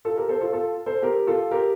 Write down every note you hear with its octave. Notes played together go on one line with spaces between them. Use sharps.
F4 A4
G4 A#4
A4 C5
F4 A4
F4 A4
A4 C5
G4 A#4
F4 A4
G4 A#4